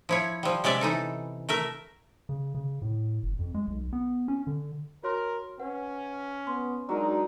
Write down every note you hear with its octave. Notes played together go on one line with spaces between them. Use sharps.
F3 E4 C#5
F3 G3
C3 G#3 C#4 D5 E5
E3 D#4 A4
A3 A#4 E5
C#3
C#3
A2
F#1
F2
G#3
B1
B3
C#4
D3
F#4 A#4 C#5 C6
C#4 B4 F#5
B3 C6
F#3 G#3 D4 D#4 A#4